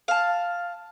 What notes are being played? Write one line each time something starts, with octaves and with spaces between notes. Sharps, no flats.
F5 A5